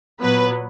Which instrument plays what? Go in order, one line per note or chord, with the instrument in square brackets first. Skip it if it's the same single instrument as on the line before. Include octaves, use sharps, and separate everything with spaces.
[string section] A#2 F#3 B3 B4